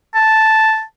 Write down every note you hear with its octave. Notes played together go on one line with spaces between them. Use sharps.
A5